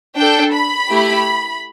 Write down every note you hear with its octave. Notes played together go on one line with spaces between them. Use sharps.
D4 A4 G5
B5
A3 E4 G4